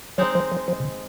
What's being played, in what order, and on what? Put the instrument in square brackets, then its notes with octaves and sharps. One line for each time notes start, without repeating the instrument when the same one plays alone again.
[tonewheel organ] F#3 [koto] G#3 C4 D#4
[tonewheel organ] F3
F3
F3
C3
C#3